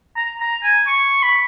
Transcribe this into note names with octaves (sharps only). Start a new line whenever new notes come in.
A#5
A#5
G#5
C#6
B5